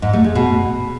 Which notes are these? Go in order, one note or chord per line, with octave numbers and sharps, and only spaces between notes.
G#2
A3
G#3
B2